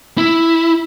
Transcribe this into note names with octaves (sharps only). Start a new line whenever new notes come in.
E4